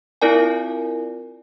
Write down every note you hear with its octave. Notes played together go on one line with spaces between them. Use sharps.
C4 E4 F4 A#4 D5 G#5